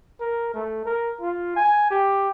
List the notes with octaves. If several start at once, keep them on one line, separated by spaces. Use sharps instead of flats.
A#4
A3
A#4
F4
G#5
G4